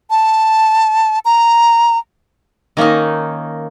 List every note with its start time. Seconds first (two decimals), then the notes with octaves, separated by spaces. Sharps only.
0.10 A5
1.25 A#5
2.77 D#3 A#3 C#4 D#4